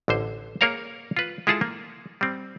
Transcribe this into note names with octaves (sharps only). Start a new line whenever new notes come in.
A1 D3 C5
A#3 G#4 A#4 C#5 F5 A#5
F4 B4
G#3 E4 F4 G#4 A4 A5
A#3
G3 C4